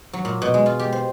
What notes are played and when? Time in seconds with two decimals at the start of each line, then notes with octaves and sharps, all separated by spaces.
0.13 F#3
0.25 A#2
0.42 B2
0.54 G#3
0.66 F4
0.79 G4
0.92 C5